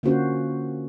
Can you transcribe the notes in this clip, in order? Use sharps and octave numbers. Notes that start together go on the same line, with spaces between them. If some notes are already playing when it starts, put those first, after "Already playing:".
D3 A#3 C#4 F4 F#4 C5